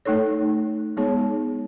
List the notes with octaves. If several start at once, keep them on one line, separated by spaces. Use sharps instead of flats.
A3 D#4 A4 C#5
G#3 B3 D#4 G#4 C#5